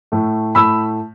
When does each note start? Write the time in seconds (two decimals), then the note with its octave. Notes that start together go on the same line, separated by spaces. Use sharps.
0.12 A2 A3
0.55 A2 A3 B5 E6